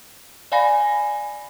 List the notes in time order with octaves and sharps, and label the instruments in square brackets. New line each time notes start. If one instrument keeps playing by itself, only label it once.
[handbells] D5 F5 G#5 B5 A#6